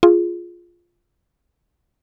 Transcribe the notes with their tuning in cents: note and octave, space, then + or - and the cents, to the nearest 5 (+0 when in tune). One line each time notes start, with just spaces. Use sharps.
F4 +0 G#4 +0